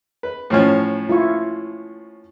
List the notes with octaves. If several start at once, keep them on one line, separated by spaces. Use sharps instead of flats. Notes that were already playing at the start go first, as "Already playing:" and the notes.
B4
A2 F3 C#4
E4 F4 C#6